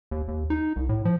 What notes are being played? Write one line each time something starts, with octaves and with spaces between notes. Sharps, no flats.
D#2
D#2
D#4
C2
A2
F3